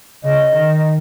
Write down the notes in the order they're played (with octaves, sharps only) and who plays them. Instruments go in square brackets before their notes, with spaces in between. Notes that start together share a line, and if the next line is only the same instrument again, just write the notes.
[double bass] C#3 [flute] D#5
[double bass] D#3